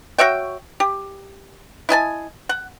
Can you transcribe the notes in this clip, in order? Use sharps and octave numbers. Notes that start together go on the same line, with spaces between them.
F#4 C#5 E5 G5
G4
E4 D#5 G#5 A5
F#5